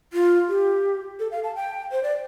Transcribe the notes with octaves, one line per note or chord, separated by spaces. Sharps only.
F4
G4
A4
F5
A5
G5
C5
D5